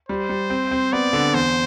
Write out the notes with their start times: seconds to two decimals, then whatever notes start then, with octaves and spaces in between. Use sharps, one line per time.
0.09 G3 C5
0.29 G3
0.50 C4
0.71 C4
0.93 B3 D5
1.13 D3
1.34 E2 C5